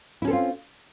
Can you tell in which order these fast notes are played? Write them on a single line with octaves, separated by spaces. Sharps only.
E4 C#4 A4 C4 F4